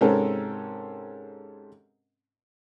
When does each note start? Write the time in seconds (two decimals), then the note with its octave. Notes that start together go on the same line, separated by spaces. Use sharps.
0.01 G#2 C3 C4 C#4 A4 A#4